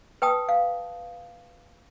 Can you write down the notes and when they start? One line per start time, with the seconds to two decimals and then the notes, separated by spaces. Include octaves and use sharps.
0.22 B4 G5 A5 D#6
0.49 F5